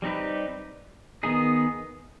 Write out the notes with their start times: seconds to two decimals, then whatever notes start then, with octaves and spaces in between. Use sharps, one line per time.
0.02 G3 C4 D#4 G4 B4
1.23 D#3 B3 D#4 G#4